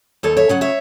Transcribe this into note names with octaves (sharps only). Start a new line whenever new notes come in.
D#2 A4 C#5
C#5 E5
C#3 F#3 C#4 F#5
C#5 E5